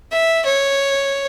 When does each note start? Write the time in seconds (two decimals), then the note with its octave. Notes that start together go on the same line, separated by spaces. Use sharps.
0.12 E5
0.45 C#5